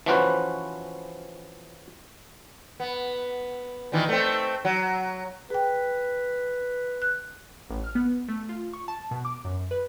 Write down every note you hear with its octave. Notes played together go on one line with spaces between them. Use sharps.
E3 F3 C#4 F#4 B4 C5
B3
A#2 D#3 E3
A3 C4
F#3
G#4 B4 G5
F#6
A1
F6
B3
A3
F4
C#6
A5
B2
D6
F#2
B4